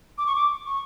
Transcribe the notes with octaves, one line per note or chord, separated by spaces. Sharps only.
D6
C#6
D6
C#6